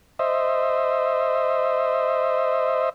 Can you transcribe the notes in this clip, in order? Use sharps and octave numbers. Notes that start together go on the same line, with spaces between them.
C5 D#5 E5